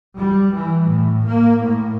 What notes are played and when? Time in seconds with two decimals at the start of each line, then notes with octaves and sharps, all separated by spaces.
0.16 G3
0.55 E3
0.87 A2
1.26 A#3
1.61 A2